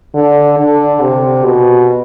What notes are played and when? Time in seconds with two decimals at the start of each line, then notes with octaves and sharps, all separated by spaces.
0.15 D3
0.58 D3
1.01 C3
1.44 B2